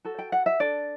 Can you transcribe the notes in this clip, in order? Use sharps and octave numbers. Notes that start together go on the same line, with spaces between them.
F#4 A4
G5
F#5
E5
D4 A4 D5